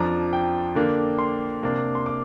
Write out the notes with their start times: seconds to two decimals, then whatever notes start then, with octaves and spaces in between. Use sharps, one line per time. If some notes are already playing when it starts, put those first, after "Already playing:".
Already playing: F2 F3 D4 A#5
0.33 G5
0.75 D3 A#3 D4
1.19 C6
1.63 C3 A#3 D4
1.95 C6
2.06 D6